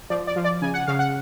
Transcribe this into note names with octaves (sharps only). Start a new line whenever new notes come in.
F3 D5
D5
F3
D5
C#3 G#5
F#5
C#3 F5
F#5